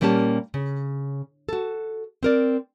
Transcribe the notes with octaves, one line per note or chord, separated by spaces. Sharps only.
A#2 G3 A#3 C#4 G4 A5
C#3
F#4 A4
C4 A#4 D5